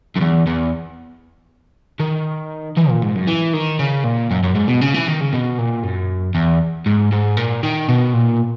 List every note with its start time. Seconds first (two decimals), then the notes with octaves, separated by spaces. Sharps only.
0.16 F#2
0.21 E2
0.47 E2
2.00 D#3
2.77 E3
2.90 A#2
3.03 G#2
3.15 F#2
3.28 E3
3.54 D#3
3.79 C#3
4.04 A#2
4.31 F#2
4.44 F#2
4.55 G#2
4.68 B2
4.81 C#3
4.94 E3
5.08 D#3
5.20 C#3
5.33 B2
5.58 A#2
5.83 F#2
6.35 E2
6.86 G#2
7.12 G#2
7.37 A#2
7.63 D#3
7.89 B2
8.14 A#2